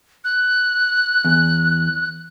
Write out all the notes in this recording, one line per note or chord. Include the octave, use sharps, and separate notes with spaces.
F#6
E2